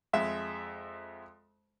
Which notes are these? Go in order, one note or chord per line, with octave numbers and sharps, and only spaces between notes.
F2 G#3 E5